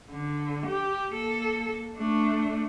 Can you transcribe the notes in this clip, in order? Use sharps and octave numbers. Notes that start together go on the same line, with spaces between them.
D3
G4
A#3 A4
A3 D4